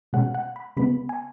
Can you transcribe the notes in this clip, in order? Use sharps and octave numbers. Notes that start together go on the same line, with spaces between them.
B2 G#3 C#4 F#5
F#5
B5
C#3 G#3 B3 B5
G#5